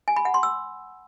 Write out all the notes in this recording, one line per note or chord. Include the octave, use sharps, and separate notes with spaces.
G#5
B5
F#5
C6
E6